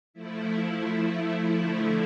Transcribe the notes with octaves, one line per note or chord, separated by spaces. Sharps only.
F3 A3 E4
D3 F3 A3 E4